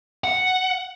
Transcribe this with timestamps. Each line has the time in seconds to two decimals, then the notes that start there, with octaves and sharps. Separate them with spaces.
0.24 F#5